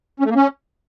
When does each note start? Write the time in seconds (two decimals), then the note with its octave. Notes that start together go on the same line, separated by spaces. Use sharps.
0.20 C#4
0.25 A3
0.31 A#3
0.36 C#4